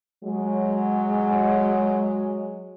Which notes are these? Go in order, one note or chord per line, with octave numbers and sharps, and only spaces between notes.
F#3 G#3